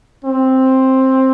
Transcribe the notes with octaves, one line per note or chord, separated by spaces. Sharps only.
C4